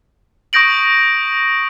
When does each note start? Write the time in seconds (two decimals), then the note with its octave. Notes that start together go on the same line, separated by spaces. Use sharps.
0.53 C#6 D#6 G6 A#6 D7 F#7